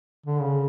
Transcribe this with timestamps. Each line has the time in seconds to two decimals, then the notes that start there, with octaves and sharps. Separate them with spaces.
0.26 D3
0.40 C#3